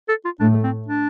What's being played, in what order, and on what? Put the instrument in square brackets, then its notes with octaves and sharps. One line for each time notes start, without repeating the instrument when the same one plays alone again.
[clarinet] A4
F4
[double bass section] A2 A3 [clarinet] D4
[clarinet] C4
D4